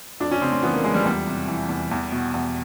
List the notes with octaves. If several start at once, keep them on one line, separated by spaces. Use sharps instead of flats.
F2 D4
C#4
C#3 C4
C4
E3 B3
A#3
F2 G#3
G3
E2 G3
C3
E3
E2
E2
B2
E2